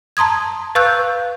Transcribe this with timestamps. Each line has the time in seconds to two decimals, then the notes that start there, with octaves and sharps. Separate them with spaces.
0.17 A5 A#5 C6 D#6 G#6
0.75 B4 F5 C#6 E6 F#6 G6